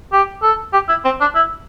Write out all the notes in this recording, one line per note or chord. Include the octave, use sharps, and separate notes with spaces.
G4
A4
G4
E4
C4
D4
E4